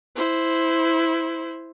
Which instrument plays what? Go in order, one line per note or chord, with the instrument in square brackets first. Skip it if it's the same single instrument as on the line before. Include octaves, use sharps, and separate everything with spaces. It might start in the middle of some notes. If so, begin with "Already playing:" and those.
[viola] E4 C5